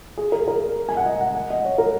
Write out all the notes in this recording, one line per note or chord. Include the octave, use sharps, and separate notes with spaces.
G#4
A#4
A#4
G#5
F#5
D#5
F#5
F#5
D#5
C#5
A#4